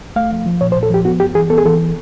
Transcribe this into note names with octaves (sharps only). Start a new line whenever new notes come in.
A3 F5
F3
F3
A#2 C#5
C5
A#2
A4
F3 G4
B3 F#4
G2 G4
E3 G#4
B3 A4
G#4
E3 A4